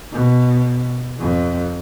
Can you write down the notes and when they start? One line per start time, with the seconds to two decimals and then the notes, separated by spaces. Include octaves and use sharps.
0.13 B2
1.20 F2